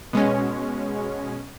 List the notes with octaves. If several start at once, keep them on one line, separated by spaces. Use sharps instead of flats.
B2 G#3 C#4